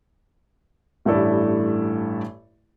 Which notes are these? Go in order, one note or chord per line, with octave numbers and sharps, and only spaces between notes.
A1 G2 A3 E4 A4 D5